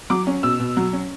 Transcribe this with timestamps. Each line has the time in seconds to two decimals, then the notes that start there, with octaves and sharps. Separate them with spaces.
0.10 F#3 D6
0.27 C#4
0.43 B2 E6
0.60 B2
0.77 F#3
0.93 C#4